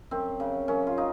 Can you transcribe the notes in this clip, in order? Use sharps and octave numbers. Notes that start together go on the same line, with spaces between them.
F#2 C4
C#3
F#2 C#4
F4
D#4